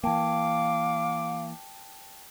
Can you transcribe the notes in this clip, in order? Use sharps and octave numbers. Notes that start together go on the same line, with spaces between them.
E3 A#3 F5 G5 A5 D6